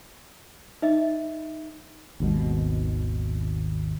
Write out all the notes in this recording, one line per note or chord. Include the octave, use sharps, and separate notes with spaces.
D#4 D#5 E5
G#1 D#2 B2 G#3